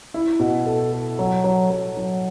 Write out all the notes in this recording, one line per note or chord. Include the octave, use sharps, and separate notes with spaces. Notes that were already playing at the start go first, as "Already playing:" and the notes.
E4
B2
A4
A4
F#3
F#3
F#3
F#3